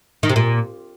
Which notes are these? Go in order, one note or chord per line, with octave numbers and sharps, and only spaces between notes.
D#3
C3
A#2